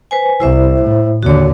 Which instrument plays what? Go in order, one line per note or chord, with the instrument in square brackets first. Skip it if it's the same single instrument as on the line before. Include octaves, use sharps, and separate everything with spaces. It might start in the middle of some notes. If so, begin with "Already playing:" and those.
[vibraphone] B4 C5 G#5
[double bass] C2 [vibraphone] E4 C5 E5
[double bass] A2
[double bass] D#2 D3 [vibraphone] F#4 C#5